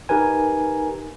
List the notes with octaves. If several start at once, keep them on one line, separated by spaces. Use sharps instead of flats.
D#4 G4 A#4 B4 G#5